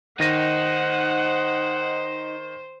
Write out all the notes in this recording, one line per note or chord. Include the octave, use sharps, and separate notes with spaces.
D#3 D#4 C5 F#5 A#6 D#7